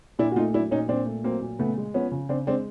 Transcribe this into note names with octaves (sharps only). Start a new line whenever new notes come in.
A#2 D4 E4
F#4
A3 D#4 F4
F#3 D4 E4
A#2 C#4 D#4
A#2 C4 D4
A3
F#3 A#3 C4
A#2
C#3 A3 B3
G#3
F3 B3 C#4
C#3
C#3 C4 D4
G#3 C4 D4